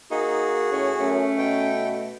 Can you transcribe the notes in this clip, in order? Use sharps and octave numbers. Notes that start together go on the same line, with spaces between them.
A#3 D#4 F#4 G#4
A2 C#4
F#2 A3 C#4
B2 G5